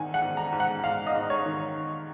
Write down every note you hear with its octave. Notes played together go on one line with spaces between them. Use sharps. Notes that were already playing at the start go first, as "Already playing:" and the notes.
Already playing: G#2 D#3 F#5 G#5
F#5
G#2
A#5
G#2
F#5
G#2 F5
D#5
G#2
C#5
D#3